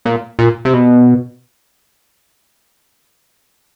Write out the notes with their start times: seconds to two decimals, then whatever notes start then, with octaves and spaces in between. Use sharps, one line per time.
0.05 A#2
0.39 A#2
0.65 C3
0.74 B2